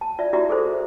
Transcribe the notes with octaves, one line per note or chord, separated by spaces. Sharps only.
A5
F4 D5 E5
E4 F#4 G4 D5 E5 A#5
G#4 A4 C5